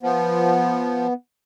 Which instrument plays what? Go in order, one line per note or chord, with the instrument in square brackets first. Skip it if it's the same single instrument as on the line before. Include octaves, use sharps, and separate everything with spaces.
[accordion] F3 [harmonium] B3